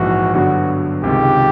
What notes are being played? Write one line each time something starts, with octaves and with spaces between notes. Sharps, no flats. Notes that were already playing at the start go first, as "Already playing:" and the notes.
Already playing: A#1 G#2 E3 F#4
G2 D3 F#3 B3 D4 F#4
C#2 C3 D#3 G#3 G4